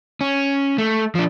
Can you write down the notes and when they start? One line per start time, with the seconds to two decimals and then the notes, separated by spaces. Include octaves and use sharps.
0.21 C#4
0.78 A3
1.15 F3 D4